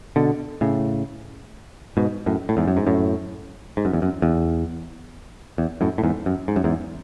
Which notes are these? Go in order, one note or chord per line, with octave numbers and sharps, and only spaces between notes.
B2 D3
A2 C#3
G#2 B2
F#2 A2
A2
E2 G#2
F#2
G#2
F#2 A2
G#2
F#2
E2
F#2
E2
E2
F#2 A2
A2
E2 G#2
F#2
G#2
F#2
E2 G#2